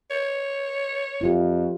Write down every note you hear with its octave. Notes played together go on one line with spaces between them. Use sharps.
C#5
F2 E4 F4 G4